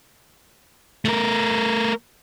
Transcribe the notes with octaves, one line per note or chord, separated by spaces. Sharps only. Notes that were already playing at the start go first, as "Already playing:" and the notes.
A3 A#4